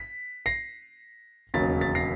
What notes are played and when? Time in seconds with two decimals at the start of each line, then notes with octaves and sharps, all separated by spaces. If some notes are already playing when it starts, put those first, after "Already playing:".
Already playing: B6
0.46 A#6 C7
1.54 E1 D#2 C#3 F#3 A6 B6
1.81 A6 B6
1.95 A#6 C7